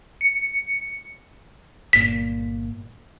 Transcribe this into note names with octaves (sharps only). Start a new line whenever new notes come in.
C#7
G1 A#2 B6